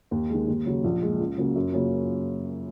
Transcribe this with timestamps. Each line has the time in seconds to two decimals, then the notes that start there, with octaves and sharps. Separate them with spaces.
0.11 D#2
0.30 D#3 G#3
0.48 D#2
0.66 C#3 F#3
0.84 A#1
1.02 A#2 G#3
1.20 C#2
1.38 C#3 F#3 A#3 C#4
1.56 F#2
1.73 C#3 F#3 A#3 C#4